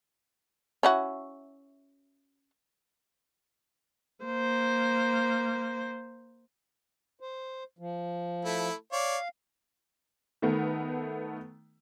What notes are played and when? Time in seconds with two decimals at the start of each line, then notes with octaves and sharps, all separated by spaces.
0.83 C#4 E4 F#4
4.25 A#3 C5
7.20 C5
7.79 F3
8.45 A3 E4
8.93 C#5 D5 F5
10.42 D#3 A3 B3